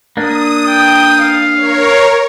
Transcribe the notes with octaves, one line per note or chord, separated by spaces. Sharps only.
A#3 D4 D#6
G5
F5
A#4 C#5